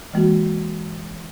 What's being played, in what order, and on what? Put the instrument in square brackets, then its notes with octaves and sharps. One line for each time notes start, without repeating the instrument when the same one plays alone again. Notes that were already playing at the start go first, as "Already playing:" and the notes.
[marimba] E3 G#3 A#3 F#4